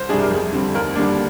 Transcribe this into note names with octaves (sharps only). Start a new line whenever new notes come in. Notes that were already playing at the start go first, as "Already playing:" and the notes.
Already playing: C2 C5
C3 G3 D4 G#4
A#4
F2 G#4
D3 G3 C4
D#2 A#4
D3 G3 A#3 D4